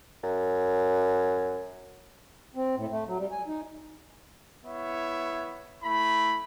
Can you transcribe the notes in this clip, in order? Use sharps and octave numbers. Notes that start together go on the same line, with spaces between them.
F#2
C4
A2
A3
F#3
G3
G#5
D#4
B3 E4 C#5 E5
A3 E4 B5